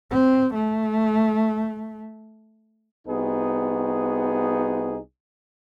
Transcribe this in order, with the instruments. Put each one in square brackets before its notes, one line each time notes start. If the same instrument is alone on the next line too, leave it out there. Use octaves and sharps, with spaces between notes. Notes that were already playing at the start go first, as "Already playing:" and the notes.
[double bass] C4
A3
[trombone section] C2 B3 D#4 F#4 G#4